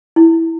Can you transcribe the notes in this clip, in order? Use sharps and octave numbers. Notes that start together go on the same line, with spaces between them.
E4